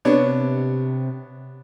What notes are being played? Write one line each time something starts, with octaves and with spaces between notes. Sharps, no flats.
C3 B3 D4 C#5